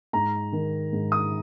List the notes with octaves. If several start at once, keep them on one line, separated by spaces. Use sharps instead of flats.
G#2 A#5
D#3
G#2
D#6